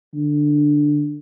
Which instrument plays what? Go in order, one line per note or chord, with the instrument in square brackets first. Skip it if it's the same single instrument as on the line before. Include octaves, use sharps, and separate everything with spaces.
[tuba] D3